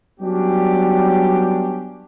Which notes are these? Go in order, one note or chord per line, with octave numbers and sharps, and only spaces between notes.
F#3 G3 B3 C#4 D4 G4